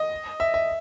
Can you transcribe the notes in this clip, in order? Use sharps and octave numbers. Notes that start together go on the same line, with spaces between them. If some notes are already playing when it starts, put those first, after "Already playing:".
Already playing: D#5
E5
E5